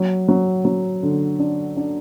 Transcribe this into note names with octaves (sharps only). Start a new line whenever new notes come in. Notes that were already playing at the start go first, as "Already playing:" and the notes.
Already playing: F#3
F#3
F#3
D3
D4
D4